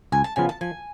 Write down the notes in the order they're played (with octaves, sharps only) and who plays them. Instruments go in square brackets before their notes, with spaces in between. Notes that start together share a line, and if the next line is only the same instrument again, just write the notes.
[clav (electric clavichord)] C#2 [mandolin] G#5
[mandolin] A5
[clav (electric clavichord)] C#3 F3 B3 F4 [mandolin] G#5
[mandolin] A5
[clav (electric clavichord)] F3 [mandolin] G#5